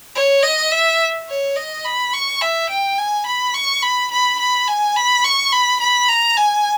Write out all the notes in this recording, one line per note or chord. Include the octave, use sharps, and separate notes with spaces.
C#5
D#5
E5
C#5
D#5
B5
C#6
E5
G5
G#5
B5
C#6
B5
B5
B5
G#5
B5
C#6
B5
B5
A#5
G#5